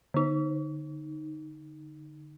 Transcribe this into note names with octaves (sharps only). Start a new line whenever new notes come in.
D3 D#4